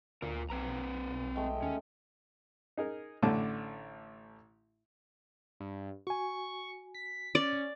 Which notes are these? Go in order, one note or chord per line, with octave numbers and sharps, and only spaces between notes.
D2 F4 A#4
B1 C4 B4 A#5
G#3 A3 G5
D#2 C#4
D#4 G#4 A#4
A1 A2 D3 A3 A5 D6
G2
F#4 G#5 C#6
B6
C#4 D5